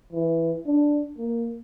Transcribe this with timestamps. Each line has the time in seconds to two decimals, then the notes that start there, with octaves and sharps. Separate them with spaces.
0.13 E3
0.66 D4
1.18 A#3